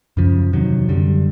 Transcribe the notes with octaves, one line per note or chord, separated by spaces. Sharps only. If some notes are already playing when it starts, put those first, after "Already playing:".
F#2 C#3 F3
E2 C3 D#3 F#3
F#2 D3 G3